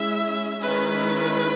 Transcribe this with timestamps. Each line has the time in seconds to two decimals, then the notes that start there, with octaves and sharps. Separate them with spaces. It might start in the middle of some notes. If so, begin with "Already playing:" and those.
Already playing: G#3 C#4 E4 E5
0.61 D#3 G#3 C#4 E4 B4